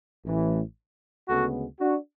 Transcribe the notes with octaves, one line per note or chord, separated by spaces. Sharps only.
A1 A2 E3
D2 C#3 G#3 B3 F#4 A4
D4 F#4